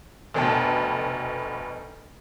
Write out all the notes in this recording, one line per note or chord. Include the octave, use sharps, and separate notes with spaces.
F1 D2 B2 G5 A5